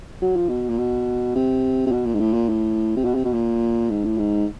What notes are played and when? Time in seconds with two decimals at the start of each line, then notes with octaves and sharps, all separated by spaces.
0.22 F#3
0.36 F3
0.49 B2
0.69 A#2
0.78 B2
1.35 C3
1.86 C3
1.92 B2
2.05 A#2
2.14 G#2
2.19 A2
2.33 A#2
2.49 A2
2.96 C3
3.05 B2
3.15 C3
3.24 B2
3.33 A#2
3.90 G#2
4.05 A2
4.18 G#2